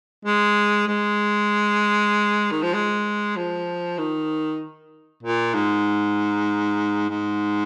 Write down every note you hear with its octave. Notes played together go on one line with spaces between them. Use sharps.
G#3
G#3
D#3
F3
G#3
F3
D#3
A#2
G#2
G#2